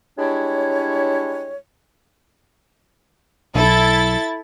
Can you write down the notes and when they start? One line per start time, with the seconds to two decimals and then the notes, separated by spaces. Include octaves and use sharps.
0.18 G3 G#3 D4 E4 C#5
3.55 B1 E4 A4 A6